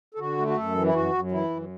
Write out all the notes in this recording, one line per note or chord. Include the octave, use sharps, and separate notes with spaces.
A4
D3 F#4
A3
F#4
F#2 A4
E3
E4
F#2 F#4
F#2
E3 E4
F#2